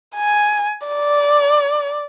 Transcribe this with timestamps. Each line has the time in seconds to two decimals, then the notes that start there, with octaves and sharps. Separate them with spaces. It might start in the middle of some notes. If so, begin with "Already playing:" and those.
0.15 G#5
0.87 D5